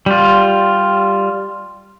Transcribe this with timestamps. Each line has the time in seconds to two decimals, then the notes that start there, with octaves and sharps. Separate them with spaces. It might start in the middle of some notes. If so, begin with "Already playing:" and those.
0.06 G3 F4